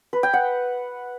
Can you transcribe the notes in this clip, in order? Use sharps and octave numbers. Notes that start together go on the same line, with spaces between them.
B4
G5
F#5